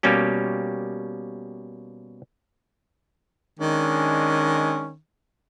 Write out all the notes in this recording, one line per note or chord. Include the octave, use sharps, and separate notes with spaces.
B2 G3 A#3 C#4 G4
D#3 G#3 C#4 D4